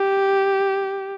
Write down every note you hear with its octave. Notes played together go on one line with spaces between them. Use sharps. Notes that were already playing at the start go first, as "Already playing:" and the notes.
Already playing: G4